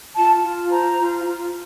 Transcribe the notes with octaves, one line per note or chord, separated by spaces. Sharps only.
F4 A5
F4
C5 A#5
F4
F4